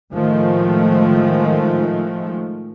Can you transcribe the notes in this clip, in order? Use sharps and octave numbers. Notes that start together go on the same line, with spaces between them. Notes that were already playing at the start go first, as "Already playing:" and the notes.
A2 D#3 F3 G#3 A3